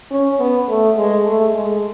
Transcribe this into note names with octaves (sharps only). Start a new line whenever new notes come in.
C#4
B3
A3
G#3
A3
G#3